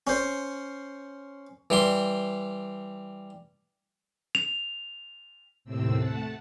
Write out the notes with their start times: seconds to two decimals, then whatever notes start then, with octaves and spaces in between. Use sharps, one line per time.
0.07 C#4 C5
1.70 E3 G3 C6
4.35 F7
5.65 D#2 A2 C3 C4 E6
5.93 A3 F#5 A5